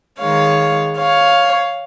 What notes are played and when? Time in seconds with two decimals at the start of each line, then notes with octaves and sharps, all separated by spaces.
0.19 D#3 G#3 C#5 F5
0.98 C#5 F5